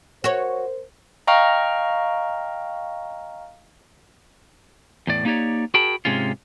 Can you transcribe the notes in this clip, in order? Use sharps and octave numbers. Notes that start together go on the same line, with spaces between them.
F#4 A#4 C5 C#5
D#5 F5 G5 A#5 C#6 F6
E2 A2 D5
A#3 D#4 G4 C#5 D5
F#4 G#4 A#4 G5 A5 B5
G#2 C3 G#3 C#4 F4